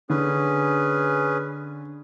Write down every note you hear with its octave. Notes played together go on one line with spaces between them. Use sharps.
D3 C#4 G#4 B4